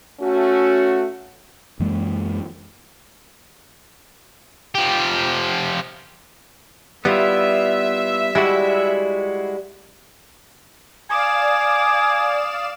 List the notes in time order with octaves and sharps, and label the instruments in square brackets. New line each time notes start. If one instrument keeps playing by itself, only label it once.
[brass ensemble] A3 C#4 F#4
[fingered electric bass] F#2 E3 G#3 A#3
[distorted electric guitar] F3 G4
[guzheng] G3 [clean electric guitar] B3 E4 F4 [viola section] E5
[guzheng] G3 [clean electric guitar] G#3 E4 F#4
[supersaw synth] D5 F5 E7 [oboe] G#5 [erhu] D6 [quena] D#6